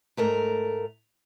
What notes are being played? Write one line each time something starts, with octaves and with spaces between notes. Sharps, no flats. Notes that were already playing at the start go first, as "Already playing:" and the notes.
G#2 A3 A#4